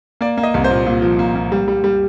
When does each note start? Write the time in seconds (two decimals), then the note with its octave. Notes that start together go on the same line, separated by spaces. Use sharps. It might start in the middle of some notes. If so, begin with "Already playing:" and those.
0.21 A#3 D5
0.37 A#3
0.43 D#5
0.54 C2
0.64 C5
0.70 A#2
0.86 A#2
1.02 F3
1.19 A#3
1.35 A#3
1.52 G3
1.68 G3
1.84 G3